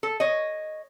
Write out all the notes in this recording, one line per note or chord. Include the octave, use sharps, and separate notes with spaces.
A4
C#5 D#5